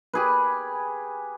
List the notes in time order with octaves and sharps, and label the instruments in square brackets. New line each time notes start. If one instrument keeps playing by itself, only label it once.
[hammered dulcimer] G4 G#4 B4